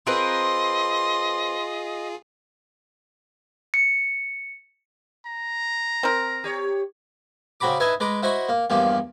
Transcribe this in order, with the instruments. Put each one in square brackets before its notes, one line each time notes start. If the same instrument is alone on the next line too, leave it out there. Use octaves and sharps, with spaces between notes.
[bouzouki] C4 A#4 B4 [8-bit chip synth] F4 G#4 [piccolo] D#5 [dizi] C6
[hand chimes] C#7
[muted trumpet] A#5
[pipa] C4 A#4
[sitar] G4 C#5
[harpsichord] C#3 C4 F#4 A#5 B5 D6
D#4 E4 B4 E5 G#5 A5
G#3 B4 A#5 D6
E4 F#4 C5 D#5 B5 C#6
A#3
E2 G2 F3 A#3 G4